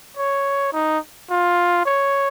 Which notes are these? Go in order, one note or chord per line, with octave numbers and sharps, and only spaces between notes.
C#5
D#4
F4
C#5